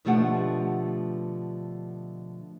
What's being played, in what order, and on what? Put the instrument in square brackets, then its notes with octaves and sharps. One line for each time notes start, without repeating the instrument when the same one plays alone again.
[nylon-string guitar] B2 D3 F3 A3 G4 F#5